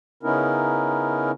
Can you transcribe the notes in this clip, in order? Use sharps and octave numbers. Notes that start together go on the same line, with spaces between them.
C#3 B3 C#4 D#4 E4 A#4